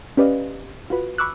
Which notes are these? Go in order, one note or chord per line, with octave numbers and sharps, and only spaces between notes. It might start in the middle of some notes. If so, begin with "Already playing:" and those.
C#4 G4 B4 D5 D#5 F5
F4 F#4 B4
B5 C#6 D6 E6 F#6